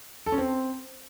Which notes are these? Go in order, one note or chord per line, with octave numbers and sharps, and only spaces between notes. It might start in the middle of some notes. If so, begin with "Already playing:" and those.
A4
C#4
C4